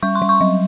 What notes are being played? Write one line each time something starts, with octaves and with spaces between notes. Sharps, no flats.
G3 C#6
C6
G3
C#6
F#3